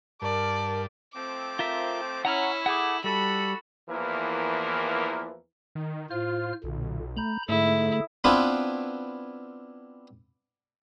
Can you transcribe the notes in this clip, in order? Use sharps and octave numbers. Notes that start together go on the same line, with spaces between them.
G2 A#4 D5 A5
F3 A3 C4 D6
F4 A#4 E5
C#4 E4 F#5 A#5 F6
A3 G#4 F#5 D6
G3 F#4 A4 B5
E2 E3 F3 A#3 A#4
D#3
A2 F4 C5 F6
B1 A#2 D3
A3 A#5 B5 G6
G#2 D3 A3 E4 G#4 A4
B3 C4 D4 E4 F4 B4